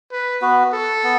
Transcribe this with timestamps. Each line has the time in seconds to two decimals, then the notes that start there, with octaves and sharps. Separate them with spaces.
0.11 B4
0.42 B3 F#4 B4
0.73 A4
1.04 B3